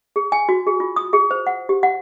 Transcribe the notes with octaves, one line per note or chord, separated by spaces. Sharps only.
G#4
G#5
F#4
G#4
F4
D#6
G#4
C5
F#5
G4
F#5